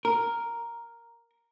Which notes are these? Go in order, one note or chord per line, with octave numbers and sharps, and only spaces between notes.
A#4